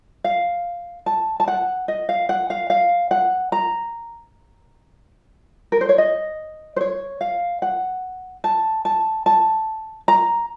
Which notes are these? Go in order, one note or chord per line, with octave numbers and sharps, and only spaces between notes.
F5
A5
A5
F#5
D#5
F5
F#5
F5
F5
F#5
A#5
A#4
C5
C#5
D#5
C5
C#5
F5
F#5
A5
A5
A5
A#5